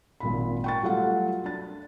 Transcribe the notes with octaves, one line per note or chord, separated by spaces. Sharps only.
G#1 A#2 B5
G5 C#6 A6
F#3 G3 A3 F4 F5 F#5
D4 A6